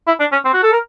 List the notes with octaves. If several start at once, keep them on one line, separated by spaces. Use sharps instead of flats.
E4
D4
C#4
C4
F#4
A4
A#4